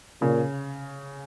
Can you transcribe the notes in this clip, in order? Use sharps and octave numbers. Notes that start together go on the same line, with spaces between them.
A#2 C#3